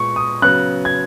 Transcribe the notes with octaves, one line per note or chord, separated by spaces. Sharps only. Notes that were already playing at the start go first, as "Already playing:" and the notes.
Already playing: A#2 G#3 B3 C#6
D#6
C#3 F#3 B3 F#6
G#6